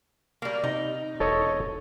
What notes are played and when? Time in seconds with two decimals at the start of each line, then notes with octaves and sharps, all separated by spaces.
0.42 G3 A#3
0.64 C3 D#4
1.20 E1 A4 C#5 D#5